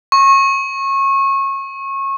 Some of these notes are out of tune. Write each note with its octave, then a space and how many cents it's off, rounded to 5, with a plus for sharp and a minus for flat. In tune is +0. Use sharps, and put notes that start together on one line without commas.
C#6 -25